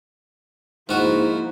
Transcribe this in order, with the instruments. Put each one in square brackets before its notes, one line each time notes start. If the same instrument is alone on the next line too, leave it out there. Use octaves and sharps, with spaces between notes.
[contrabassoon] G#2 [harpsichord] F3 F#4 [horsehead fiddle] A#3 E4